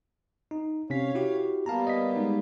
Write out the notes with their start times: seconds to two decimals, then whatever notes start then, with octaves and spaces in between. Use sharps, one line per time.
0.51 D#4
0.90 C3 C#4 C#5 F5 B6
1.15 E4 F#4 G4
1.66 G3 A#3 B3 F5 A5 A#5
1.87 D#5 B6
2.16 G#3 D#4